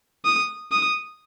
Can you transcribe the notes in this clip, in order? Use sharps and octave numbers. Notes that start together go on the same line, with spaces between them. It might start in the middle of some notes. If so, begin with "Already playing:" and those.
D#6
D#6